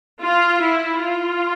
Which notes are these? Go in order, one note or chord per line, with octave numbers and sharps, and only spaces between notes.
F4
E4
F4